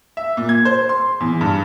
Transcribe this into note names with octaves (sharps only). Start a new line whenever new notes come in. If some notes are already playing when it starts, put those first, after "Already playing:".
E5
A#2
G#6
C5
C6
E2
G2